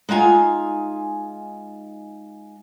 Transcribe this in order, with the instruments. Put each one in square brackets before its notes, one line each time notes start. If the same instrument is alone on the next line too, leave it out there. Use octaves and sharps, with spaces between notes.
[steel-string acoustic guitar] G#3 D#4 F4 G#5